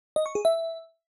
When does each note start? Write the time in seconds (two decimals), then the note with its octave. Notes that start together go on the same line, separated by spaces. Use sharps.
0.16 D#5
0.26 C#6
0.35 G#4
0.45 E5